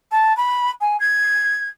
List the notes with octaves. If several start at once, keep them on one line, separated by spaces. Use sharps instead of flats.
A5
B5
G#5
G#6